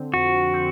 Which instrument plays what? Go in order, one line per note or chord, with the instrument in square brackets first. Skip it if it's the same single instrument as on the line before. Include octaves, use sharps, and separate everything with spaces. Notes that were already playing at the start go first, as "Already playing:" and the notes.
Already playing: [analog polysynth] D3 C4
[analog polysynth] F2 [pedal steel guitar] F#4
[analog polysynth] C4